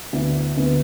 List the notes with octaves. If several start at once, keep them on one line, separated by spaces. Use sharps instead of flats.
D2 D3 B3 E4
D2 D3 B3 E4